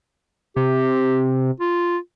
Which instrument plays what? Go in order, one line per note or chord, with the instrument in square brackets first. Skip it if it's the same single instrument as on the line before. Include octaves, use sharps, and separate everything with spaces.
[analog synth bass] C3 [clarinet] G4
[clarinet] F4